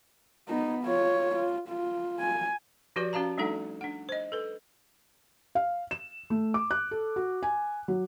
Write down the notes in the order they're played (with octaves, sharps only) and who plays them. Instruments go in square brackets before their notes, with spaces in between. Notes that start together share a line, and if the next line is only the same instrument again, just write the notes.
[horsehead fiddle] B3 D#4
F4 C#5
F4
F4
G#5
[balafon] F3 F#4 G4 B4 D5
C#4 F#4 F5 A5 A#5
G3 A3 D4 D#4 A4 F#5
D4 F#5
C5 D#5
A4 B4
[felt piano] F5
E7
A3
D6
F#6
A4
F#4
G#5
F#3